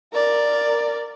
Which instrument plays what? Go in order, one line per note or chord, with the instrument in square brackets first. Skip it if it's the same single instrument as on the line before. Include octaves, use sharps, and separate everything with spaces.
[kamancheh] A#4 D5